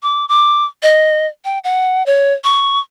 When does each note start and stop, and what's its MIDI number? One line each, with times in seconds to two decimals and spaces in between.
0.03 0.27 86
0.29 0.65 86
0.83 1.27 75
1.45 1.59 79
1.64 2.05 78
2.06 2.33 73
2.44 2.80 85